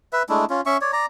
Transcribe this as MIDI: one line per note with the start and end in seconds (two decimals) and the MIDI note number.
0.13 0.23 71
0.13 0.23 76
0.29 0.45 56
0.29 0.45 57
0.29 0.45 62
0.29 0.45 64
0.50 0.61 61
0.50 0.61 65
0.66 0.77 61
0.66 0.77 76
0.66 0.77 85
0.81 0.92 73
0.81 0.92 74
0.93 1.06 74
0.93 1.06 82